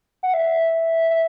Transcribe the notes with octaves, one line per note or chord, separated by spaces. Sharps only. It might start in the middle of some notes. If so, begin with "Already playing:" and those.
F#5
E5
E5